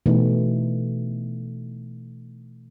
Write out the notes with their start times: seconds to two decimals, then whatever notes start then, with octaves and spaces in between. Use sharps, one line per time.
0.06 B2 E3 A3 D#4